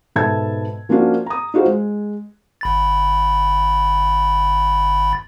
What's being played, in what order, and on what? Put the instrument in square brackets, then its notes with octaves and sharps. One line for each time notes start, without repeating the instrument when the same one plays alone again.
[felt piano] G#2 B2 A4 E5 A5 G#6
F3 A#3 C#4 D4 F4 F#4
A#5 D#6
D#4 F4 F#4 G#4 C5
G#3
[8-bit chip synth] G1 B5 A6